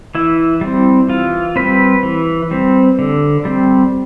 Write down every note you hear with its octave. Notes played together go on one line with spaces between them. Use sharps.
E3 E4
G3 C4
E3 F4
G3 C4 B4
E3
G3 C4
D3
G3 C4